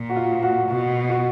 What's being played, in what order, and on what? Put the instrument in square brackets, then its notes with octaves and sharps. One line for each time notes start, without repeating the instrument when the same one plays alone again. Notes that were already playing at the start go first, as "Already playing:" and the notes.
Already playing: [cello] A#2
[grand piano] F#4
F4
F#4
[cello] B2 [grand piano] F#4
[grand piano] F#4